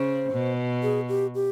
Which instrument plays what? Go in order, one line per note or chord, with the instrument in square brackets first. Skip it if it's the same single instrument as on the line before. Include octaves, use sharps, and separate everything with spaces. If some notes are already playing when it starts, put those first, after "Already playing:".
Already playing: [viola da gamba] C#3 [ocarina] C5
[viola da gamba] B2
[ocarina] G#4
G4
G4